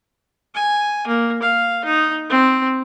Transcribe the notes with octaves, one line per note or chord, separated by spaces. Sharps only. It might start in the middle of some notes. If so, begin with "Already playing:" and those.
G#5
A#3
F5
D#4
C4